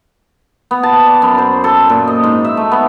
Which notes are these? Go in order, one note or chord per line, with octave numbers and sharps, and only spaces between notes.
B3
A5
D5
F#2
C5
A4
A#2
D#5
G#2
E5
A3
B3